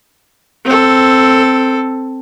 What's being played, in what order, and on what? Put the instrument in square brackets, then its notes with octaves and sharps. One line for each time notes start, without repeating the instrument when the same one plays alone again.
[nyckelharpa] C4 A4